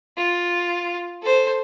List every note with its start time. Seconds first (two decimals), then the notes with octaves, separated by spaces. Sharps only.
0.17 F4
1.22 A4 C5